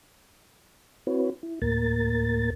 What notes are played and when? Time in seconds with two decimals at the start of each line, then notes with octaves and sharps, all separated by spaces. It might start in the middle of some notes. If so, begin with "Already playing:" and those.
1.07 C4 E4 F#4 B4 C#5
1.43 E4
1.62 D2 A2 A#3 A#4 A6